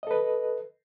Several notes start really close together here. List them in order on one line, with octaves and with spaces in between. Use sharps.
D#5 A4 B4